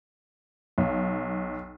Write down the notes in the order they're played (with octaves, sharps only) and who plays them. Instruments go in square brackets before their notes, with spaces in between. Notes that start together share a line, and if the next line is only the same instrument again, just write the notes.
[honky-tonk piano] B1